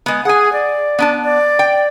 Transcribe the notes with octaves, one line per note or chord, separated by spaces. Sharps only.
G#3 B3
G#4 F#5 G#5
D5
B3 D4 A5
D5
G5